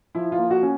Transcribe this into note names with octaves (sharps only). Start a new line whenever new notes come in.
F3 E4
F4
A#3
F#4
C#4